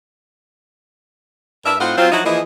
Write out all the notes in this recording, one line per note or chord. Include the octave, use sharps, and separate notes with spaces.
G2 D4 A#4 E5
A2 C4 D#4 F4 F#5
F#3 C4 F4
F3 F#3 D#4 E4 F#4
E3 F3 A#3 E4 G#4 D#5